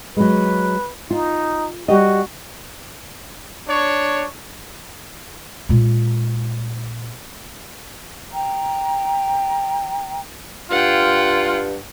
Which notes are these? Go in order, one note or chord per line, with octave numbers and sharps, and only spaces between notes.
F#3 G#3 B4
D#4 F4
G3 F#4 G4 D#5
D4 C#5
A#2 G#3
G5 A#5
G2 F4 F#5 G5